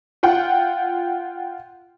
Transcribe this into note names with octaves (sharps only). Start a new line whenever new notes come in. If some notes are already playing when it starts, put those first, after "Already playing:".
F4 F#5 G5